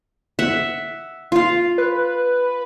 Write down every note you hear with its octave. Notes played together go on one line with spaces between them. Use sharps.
E5 F#5
F4 F5
B4